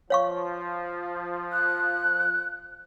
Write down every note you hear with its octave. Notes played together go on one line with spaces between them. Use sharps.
F3 C#5 F5 C#6
F#6